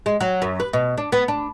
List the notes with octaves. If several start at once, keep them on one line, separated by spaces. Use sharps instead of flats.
G#3
F#3
F#2
B4
B2
D4
B3
D4